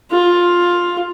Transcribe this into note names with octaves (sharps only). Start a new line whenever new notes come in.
F4